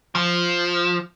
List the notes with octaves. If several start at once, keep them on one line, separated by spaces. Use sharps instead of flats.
F3